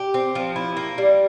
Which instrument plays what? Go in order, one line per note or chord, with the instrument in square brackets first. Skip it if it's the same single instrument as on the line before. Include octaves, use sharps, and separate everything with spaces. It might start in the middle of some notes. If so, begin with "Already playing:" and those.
Already playing: [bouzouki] G4
C4
F3
E4
A#3
G3